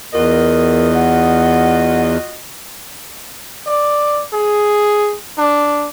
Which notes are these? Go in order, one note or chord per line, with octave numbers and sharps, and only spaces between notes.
E2 F4 F#4 A#4 D#5
F#5
D5
G#4
D4